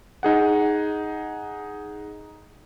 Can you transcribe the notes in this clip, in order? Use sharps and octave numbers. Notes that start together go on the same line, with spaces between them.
D#4 G#4 F#5